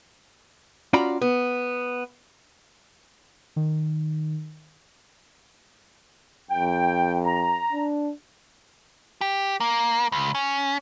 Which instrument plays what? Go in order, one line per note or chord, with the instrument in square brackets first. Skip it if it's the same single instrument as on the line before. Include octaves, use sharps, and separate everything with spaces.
[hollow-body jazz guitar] C#4 F4 F#4 D5 A#5 B5
B3
[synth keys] D#3
[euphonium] F2 [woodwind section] G5
[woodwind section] A#5
[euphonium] D4
[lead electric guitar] G4
A#3
C#2
C#4